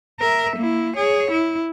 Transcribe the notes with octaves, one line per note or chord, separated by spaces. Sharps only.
A#4 E5
A#3 E4
G#4 C#5
E4